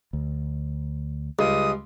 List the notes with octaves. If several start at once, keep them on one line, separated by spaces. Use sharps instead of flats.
D2
C#2 G3 G#3 D#6